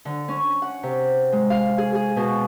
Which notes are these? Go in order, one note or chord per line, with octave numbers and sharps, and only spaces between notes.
D3
C#4
F#5
C3
G#3
F5
G#4
G#4
B2